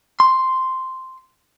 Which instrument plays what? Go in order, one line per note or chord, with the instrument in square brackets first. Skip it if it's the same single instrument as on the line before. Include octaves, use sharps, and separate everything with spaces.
[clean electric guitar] C6